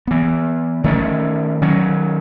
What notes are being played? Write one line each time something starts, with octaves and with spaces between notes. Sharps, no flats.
E3 B3
D#3 A3 C#4
D#3 F#3 C#4